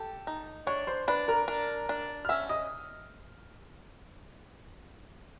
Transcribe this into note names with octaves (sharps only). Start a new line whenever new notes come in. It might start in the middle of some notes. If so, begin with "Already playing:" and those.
Already playing: G4 A4 A5
D#4
D4 C#5 C#6
C5 C6
D4 B4 B5
A#4 A#5
D4
D4
F6
C#4 E5 E6
D#5 D#6